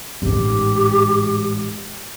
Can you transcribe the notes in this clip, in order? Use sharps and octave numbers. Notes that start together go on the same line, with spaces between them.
A1 G#2 G4